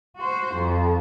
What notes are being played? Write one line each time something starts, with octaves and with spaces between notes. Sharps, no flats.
F#4 C5
F2